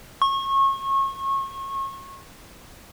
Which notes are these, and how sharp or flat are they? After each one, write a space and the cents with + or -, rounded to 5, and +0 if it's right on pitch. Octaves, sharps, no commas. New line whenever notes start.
C#6 -30